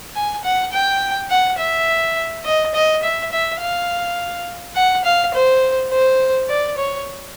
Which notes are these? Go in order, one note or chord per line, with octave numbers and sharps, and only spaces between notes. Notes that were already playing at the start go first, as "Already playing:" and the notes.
G#5
F#5
G5
F#5
E5
D#5
D#5
E5
E5
F5
F#5
F5
C5
C5
D5
C#5